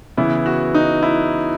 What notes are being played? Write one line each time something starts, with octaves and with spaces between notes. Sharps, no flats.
C#3 E3 B3 E4
F#4
D#4
E4